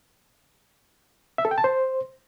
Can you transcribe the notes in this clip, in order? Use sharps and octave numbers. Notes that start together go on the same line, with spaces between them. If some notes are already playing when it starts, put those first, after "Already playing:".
E5
A4
G5
A5
C5